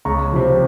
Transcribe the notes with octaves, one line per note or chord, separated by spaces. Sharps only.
C#2 A#5 C#6
C3 F3